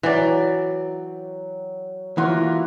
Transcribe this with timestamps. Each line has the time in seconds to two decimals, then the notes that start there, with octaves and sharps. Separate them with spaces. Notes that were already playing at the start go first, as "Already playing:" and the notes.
0.03 E3 F#3 D5 G5
2.18 E3 A#3 F4 F#4